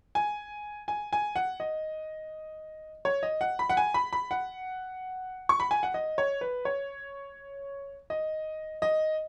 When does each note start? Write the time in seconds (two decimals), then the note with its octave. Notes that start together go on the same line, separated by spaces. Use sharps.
0.15 G#5
0.88 G#5
1.13 G#5
1.36 F#5
1.60 D#5
3.05 C#5
3.23 D#5
3.41 F#5
3.59 B5
3.70 F#5
3.77 G#5
3.94 B5
4.13 B5
4.31 F#5
5.49 C#6
5.60 B5
5.71 G#5
5.83 F#5
5.94 D#5
6.18 C#5
6.41 B4
6.65 C#5
8.10 D#5
8.82 D#5